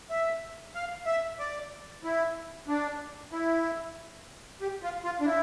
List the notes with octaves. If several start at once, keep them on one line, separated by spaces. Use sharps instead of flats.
E5
F5
E5
D5
E4
D4
E4
G4
F4
F4
D4
E4